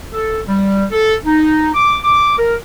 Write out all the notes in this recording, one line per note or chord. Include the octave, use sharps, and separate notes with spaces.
A4
G3
A4
D#4
D6
D6
A#4